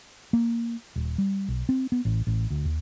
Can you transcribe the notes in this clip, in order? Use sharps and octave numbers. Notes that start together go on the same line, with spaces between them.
A#3
D#1
G3
B1
C4
B3
A1
A1
D2
D#2